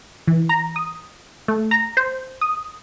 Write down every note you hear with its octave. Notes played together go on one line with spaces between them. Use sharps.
E3
A#5
D#6
A3
A#5
C5
D#6